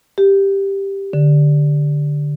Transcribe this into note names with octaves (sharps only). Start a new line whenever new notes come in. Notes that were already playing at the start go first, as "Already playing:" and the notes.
G4
D3